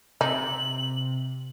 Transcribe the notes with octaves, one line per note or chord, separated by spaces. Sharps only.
C3 D#4 F#7